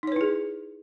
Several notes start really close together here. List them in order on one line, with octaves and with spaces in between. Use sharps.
D#4 C#5 B4 E4 G#4